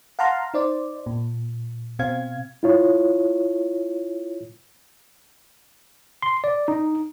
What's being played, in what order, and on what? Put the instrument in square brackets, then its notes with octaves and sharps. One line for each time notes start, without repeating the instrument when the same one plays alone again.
[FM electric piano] F5 F#5 A5 A#5 C6 F6
D#4 C5 D5
A#2
B2 C4 F5 G#6
[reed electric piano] E4 F4 C#5
[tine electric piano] C6
D5
D#4